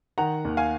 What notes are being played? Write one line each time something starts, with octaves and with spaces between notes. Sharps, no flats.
D#3 F#5 A#5
D#2
F5 G#5